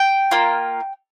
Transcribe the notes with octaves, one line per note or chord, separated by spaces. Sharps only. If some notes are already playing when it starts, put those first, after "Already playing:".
Already playing: G5
A#3 F4